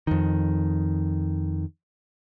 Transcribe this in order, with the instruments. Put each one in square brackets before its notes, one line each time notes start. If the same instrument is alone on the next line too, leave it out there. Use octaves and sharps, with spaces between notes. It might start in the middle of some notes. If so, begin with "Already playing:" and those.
[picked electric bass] F2 D#3